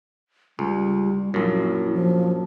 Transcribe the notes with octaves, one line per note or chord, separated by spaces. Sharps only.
C#2 G3
A#1 F#2 E4
F3